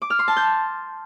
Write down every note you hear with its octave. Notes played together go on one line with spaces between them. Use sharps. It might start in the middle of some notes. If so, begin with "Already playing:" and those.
D6
F6
C6
A5
G6